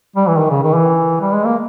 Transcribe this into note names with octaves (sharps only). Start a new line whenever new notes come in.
G3
E3
D#3
C#3
D#3
E3
G3
G#3
A#3